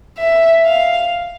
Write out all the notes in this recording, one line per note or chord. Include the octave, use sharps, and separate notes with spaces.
E5
F5